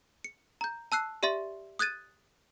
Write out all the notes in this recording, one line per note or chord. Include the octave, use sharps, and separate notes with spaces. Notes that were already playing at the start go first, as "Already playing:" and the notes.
C#7
A#5 G6
A5 E6 F#6 C7
G4 D5 E5 C6 A6
D#6 F#6 G#6 A6 D#7